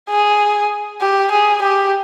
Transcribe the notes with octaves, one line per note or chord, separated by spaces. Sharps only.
G#4
G4
G#4
G4